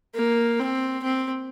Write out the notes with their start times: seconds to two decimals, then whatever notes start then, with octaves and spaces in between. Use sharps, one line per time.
0.15 A#3
0.59 C4
1.03 C4